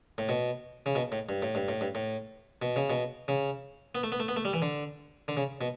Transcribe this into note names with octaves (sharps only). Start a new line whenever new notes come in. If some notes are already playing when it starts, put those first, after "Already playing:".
A2
B2
C#3
B2
A2
G2
A2
G2
A2
G2
A2
B2
C#3
B2
C#3
B3
A3
B3
A3
B3
A3
G3
E3
D3
D3
C#3
B2